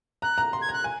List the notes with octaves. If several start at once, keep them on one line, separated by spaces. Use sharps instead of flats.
A#5 F#6
A#5
C6
G#6
A#5 F#6
G#5